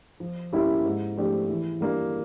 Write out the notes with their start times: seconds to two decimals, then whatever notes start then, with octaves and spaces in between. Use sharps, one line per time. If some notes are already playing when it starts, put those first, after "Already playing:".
0.20 F3
0.53 A#3 C#4 E4 G4
0.85 G#2
1.17 F3 A3 D4 G4
1.49 E3
1.81 G3 A#3 D4